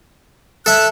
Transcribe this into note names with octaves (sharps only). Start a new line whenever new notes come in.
A4 E5 F#6